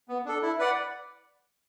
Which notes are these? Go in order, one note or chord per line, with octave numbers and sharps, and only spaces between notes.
B3
D4 A4
E4
B4 D5 F#5